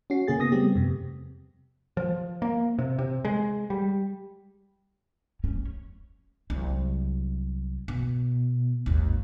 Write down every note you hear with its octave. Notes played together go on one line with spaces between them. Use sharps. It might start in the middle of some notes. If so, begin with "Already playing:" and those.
C#4 F#4 C7
C#3 A#3 G#4 A6
C#3 B3 D#6 A#6
G3 A3 B3 C4 G4
F2 C3
F3
A#3
C3
C3
G#3
G3
C#4
C2 F#3
B2
G#1 D#2